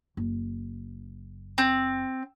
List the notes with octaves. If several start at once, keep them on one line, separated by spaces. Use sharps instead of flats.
F#1
C4